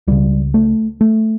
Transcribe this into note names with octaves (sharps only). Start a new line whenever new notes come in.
C#2 C#3 G3
A3
A3